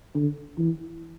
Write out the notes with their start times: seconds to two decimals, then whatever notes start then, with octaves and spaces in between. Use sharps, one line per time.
0.15 D3
0.58 E3